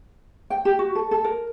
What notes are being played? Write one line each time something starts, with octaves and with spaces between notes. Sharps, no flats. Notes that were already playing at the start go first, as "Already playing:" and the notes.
G5
G4
F#4
A4
A4
A#4